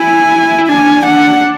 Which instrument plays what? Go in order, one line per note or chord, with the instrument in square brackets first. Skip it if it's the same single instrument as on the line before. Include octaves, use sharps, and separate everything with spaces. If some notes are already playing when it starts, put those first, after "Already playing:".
Already playing: [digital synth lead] E4 [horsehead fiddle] G#5
[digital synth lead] E4
[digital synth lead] D4 [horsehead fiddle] G#5
[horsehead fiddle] F#5